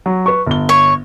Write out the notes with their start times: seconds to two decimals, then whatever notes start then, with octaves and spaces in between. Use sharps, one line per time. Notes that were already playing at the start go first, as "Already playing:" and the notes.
0.06 F#3
0.26 B4 C#6
0.47 G1 G7
0.69 C#5